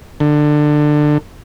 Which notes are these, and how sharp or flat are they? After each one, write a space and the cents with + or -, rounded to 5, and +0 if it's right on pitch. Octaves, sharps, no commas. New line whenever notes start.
D3 +20